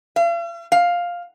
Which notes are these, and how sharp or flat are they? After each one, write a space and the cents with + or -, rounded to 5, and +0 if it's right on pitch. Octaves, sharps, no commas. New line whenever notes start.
F5 -45
F5 +5